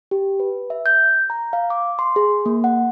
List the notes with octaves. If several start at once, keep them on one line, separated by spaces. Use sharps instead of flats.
G4
B4
E5
G6
A#5
F5
D6
C6
G#4
A#3
F#5